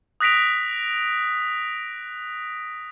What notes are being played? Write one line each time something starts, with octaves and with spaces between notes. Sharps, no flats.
D#6 F#6 A#6 B6 D7 F7